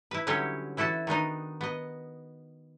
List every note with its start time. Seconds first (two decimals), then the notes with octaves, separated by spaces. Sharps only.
0.11 E4 B4
0.27 D3 F#3 G3 C#4 G4 C#5
0.77 E3 E4 F#4 A4 A5
1.07 D#3 B3 D4 D#4
1.61 B3 D#5